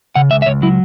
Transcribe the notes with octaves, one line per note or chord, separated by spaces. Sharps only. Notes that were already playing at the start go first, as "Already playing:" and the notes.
C#3 F#5
C#2 E5
E5
C#2 C#5
F#3 E4